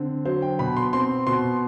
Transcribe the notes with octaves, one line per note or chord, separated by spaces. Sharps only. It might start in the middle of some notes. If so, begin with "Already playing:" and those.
Already playing: D3 C4
F#3 C5
G5
B2 B5
C6
C4 C6
B2 C6